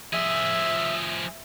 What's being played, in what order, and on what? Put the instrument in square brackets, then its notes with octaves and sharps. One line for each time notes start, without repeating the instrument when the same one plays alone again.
[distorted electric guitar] F3 G#4 [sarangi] E5